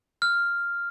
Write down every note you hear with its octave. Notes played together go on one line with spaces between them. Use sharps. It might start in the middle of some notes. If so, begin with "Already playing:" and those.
F6